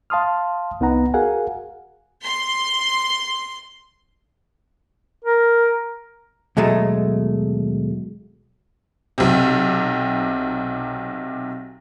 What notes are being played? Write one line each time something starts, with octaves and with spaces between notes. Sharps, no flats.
F5 A5 C6 D#6 F6
C2 B3 D#4 B4 F#5 A#5
F#4 G#4 A#4 F5 F#5 G#5
C6
A#4
D#2 B2 F#3 G#3 A3
B1 C3